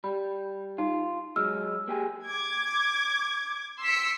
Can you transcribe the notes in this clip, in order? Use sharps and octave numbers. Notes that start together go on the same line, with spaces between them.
G3 B5
D#4 F4
F#3 G#3 E6 F6
A#3 G4 G#4
D6 G#6
C6 E6 B6 C#7 D7